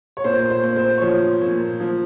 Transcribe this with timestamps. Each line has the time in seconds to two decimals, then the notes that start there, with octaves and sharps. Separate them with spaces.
0.17 C#5
0.24 A#2 C5
0.50 C5
0.63 A#2
0.76 C5
0.98 C#5
1.02 F3 C5
1.41 A#2
1.80 F3